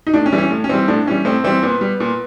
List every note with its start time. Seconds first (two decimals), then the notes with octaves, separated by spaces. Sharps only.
0.07 D#4
0.14 A2 D4
0.26 C#4
0.32 E3 G3
0.38 C#4
0.51 A2
0.64 C#4
0.69 E3 G3 C4
0.88 A2 D4
1.06 E3 G3 C#4
1.25 A2 C4
1.44 E3 G3 C4
1.63 A#2 B3
1.81 G3
2.00 A#2